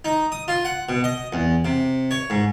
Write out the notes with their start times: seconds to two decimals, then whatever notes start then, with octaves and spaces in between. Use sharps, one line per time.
0.05 D#4
0.32 D#6
0.48 F4
0.65 F#5
0.89 B2
1.04 D#5
1.33 E2
1.65 C3
2.11 C#5
2.30 G#2